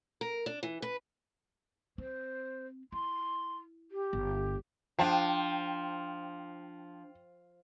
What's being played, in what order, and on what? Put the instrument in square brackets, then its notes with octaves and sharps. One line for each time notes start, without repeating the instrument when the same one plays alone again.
[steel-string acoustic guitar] A#4
D4
E3
B4
[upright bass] C4 [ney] C5
[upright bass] E4 [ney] C6
[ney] G4
[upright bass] G1
[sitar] F3 [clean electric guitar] D4 A5 [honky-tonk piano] G5